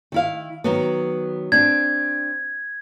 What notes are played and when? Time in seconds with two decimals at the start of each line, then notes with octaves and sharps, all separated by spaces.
0.12 D#3 E4 F5
0.64 D#3 F#3 B3
1.52 C4 D4 G#6